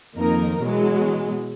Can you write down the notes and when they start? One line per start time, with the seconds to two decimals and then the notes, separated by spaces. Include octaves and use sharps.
0.16 F2 D#3 A#3 D#4 A#4
0.61 B2 E3 F#3 G#3